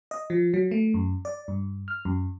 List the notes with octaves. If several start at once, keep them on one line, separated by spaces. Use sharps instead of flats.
D#5
F3
F#3
A3
F#2
D5
G2
F6
F#2